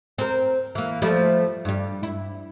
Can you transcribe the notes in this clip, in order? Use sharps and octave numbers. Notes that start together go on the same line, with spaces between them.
C4 A#4
E3 A#3
F3 G3 A3
G2 G3
E4